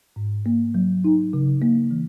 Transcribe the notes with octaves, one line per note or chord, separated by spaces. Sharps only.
G#2
A#3
F#3
D#4
C#3
A#3
E3